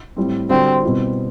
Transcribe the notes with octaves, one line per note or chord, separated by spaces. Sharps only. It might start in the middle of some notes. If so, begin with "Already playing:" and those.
A2 G3 C4
D3 G3 C4 D4 F#4
B2 G3 C4 E4